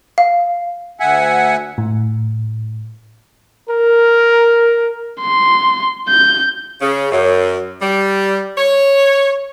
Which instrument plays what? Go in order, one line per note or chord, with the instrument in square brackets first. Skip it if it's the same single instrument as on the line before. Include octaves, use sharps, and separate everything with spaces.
[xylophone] F5
[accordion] D2 E5 F#5 G#5
[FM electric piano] A2
[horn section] A#4
[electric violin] C6
G6
[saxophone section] C#3
F#2
G3
C#5